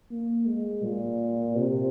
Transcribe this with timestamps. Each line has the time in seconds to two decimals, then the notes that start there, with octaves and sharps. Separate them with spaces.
0.11 A#3
0.47 G#3
0.83 A#2
1.57 C3